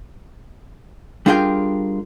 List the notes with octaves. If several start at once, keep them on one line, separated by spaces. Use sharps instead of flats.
G3 D4 F4 G#4 A#4 G5